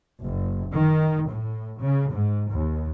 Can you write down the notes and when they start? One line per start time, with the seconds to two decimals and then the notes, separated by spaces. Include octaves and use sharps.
0.23 F#1
0.74 D#3
1.30 A2
1.82 C#3
2.12 G#2
2.50 D#2